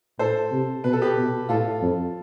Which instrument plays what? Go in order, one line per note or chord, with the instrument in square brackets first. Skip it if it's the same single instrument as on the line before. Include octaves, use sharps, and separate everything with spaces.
[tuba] A2 [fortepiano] A4 C5
[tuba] C3
[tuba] B2 [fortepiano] B4
[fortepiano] A4
G4 B4
[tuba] B2
[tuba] A2 [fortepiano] F4 A4
[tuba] F2